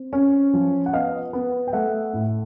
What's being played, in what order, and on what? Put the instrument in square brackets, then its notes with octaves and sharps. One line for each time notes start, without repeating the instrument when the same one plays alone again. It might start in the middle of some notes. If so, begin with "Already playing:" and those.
Already playing: [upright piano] C4
C#4
F3
F#5
B3 D#5 F5
B3
G5
A3 E5 F#5
A2